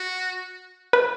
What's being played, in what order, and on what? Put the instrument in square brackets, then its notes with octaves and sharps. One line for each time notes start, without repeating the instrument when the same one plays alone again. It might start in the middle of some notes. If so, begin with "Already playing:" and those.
Already playing: [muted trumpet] F#4
[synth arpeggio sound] B4